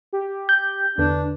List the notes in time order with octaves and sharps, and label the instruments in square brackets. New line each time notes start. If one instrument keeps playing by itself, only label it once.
[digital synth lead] G4
[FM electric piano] G6
[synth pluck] E2 D3 B4 [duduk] D4